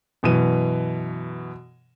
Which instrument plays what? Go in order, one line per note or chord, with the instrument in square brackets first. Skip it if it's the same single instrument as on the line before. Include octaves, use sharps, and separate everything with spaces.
[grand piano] F#2 B2 E3 D#7